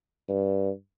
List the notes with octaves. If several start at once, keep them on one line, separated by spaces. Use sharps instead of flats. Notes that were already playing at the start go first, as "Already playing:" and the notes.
G2